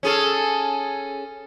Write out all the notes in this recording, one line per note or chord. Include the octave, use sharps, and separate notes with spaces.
C#4 G#4 A4